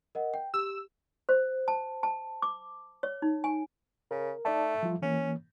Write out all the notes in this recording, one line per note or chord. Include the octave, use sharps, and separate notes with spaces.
A#4 D#5 F#5
G5
G4 E6
C5
A5
A5
D6
C#5
D#4
G#5
C#3 A#4
A3 D#4 D5 A5
F3 G3 F4
E3 A#3 C#4